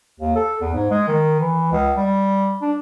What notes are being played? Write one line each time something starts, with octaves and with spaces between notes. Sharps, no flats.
D#2
A4
E2
G#2
G#3
D#3
E3
C#2
G3
D4